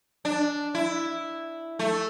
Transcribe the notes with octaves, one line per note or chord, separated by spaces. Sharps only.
D4
E4
A3